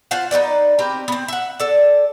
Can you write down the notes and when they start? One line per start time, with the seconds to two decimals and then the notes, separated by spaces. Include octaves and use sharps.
0.11 F4 C5 F5 F#5
0.31 D#4 F4 B4 D5
0.79 C4 G4 A#4 B4
1.08 B3 C4
1.28 E5 F#5
1.60 A4 D5